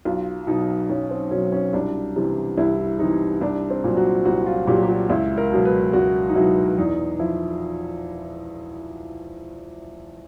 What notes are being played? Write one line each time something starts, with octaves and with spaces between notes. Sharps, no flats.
B1 F4
B2 F#3 D#4
B1 C#4
C4
B2 F#3 C#4
C#4
C2 D4
C3 E3
C2 E4
C3 E3 D#4
C2 D4
C4
A#2 F#3
F#4
C2 F#4
F4
A#2 F#3 G4
G4
F#4
C#2 E4
A#4
B2 F#3
B4
C#2 F#4
D#4
B2 F#3 E4
E2 D#4
F3 E4